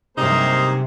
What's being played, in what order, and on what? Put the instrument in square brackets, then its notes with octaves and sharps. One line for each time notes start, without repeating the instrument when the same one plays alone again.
[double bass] G2 F#3 [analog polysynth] C3 [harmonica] A#3 G#4 C5 [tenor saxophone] D#4